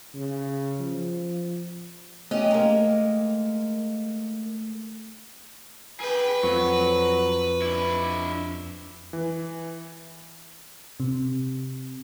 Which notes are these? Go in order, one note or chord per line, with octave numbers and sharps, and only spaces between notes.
C#3
F3
A3 C#4 G4 D#5
G#3 A#3
G#4 B4 G5
F2 F3 F#3 C#6
D4 E4
E3
C3